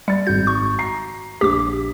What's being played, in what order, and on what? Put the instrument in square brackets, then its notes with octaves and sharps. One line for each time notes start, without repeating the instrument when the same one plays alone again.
[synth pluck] G3 [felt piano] A6 C#7
[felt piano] G#1 F#4 [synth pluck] G6
[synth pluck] C#6
[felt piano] A#5 C7
[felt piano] A#1 B6 [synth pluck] G4 D6